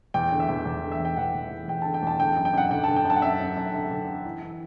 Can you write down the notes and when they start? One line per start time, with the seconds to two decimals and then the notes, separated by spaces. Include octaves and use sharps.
0.14 E2 G5
0.32 D3
0.40 E5
0.49 E2
0.66 E2
0.83 D3
0.92 E5
1.00 E2
1.05 G5
1.17 E2 F#5
1.34 E2
1.51 E2
1.68 E2 G5
1.82 D3 A5
1.94 G5
2.03 E2 A5
2.19 D3 G5
2.37 F#2
2.45 G5
2.53 F#2 F#5
2.71 D3 G5
2.84 A5
2.88 D3
2.96 G5
3.05 F#2
3.10 A5
3.16 F#5
3.22 F#2 E5
3.40 F#2
3.56 F#2
3.73 D3
3.91 D3
4.08 D3
4.25 E3
4.42 E3